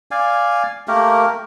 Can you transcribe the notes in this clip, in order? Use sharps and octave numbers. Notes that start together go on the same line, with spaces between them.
D5 F5 G#5
A3 A#3 G4 A#4